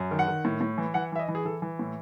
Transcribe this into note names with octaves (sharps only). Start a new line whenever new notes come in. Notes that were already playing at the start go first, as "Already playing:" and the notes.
Already playing: F#2
D#3
F#5
D#3
A2
A2
E3
E3 F#5
E3 E5
D#5
E3
G#4
E3 A4
E3
A2